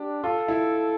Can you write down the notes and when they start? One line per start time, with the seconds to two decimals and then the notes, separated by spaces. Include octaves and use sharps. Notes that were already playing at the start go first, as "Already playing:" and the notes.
Already playing: D4 G4
0.23 F4 A4
0.48 E4